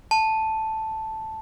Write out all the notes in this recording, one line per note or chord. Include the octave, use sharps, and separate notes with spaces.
A5